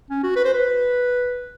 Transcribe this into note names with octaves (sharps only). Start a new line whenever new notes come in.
C#4
F#4
B4
C5
B4